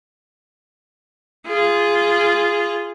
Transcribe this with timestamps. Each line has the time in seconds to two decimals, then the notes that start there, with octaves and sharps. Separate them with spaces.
1.47 F4 G#4